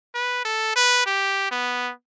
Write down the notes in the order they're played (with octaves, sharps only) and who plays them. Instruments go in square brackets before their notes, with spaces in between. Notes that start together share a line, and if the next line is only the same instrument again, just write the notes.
[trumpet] B4
A4
B4
G4
B3